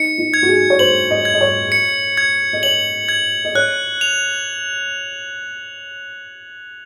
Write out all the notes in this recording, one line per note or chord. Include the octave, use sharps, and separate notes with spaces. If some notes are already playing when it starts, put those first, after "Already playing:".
Already playing: D#4 C#7
D#4
G#6
F#4
G#4
C#5
C5 F#7
D#5
G#6
D#5
C#5
C#7
G#6
D#5
C#5 F#7
G#6
D#5
C#5 F#6
F7